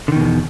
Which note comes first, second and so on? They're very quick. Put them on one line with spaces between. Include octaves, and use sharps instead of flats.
D3 D#3 B2 E2